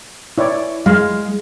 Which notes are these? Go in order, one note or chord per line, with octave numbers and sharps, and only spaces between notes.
E4 C#5 D5
G#3 F5